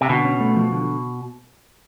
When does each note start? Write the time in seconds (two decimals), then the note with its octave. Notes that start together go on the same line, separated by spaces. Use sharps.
0.01 C3
0.09 B2 D3
0.25 C#4
0.40 A3
0.56 F3
0.72 D3